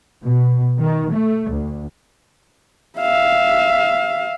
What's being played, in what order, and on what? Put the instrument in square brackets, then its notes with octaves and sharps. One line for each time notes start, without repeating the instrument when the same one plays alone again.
[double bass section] B2
D#3
A3
D2
[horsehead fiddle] E5 F5